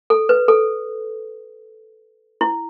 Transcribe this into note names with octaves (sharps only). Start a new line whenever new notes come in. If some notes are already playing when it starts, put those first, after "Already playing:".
A4
B4
A4
E4